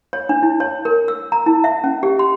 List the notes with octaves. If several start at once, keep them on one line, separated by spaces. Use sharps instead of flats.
C#5
D4
E4
C#5
A#4
E6
A#5
E4
E5
C#4
G4
C6